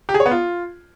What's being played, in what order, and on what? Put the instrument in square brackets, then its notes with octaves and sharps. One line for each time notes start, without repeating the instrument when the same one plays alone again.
[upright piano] G4
G#4
C#5
B3
F4